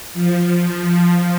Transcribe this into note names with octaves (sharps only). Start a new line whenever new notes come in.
F3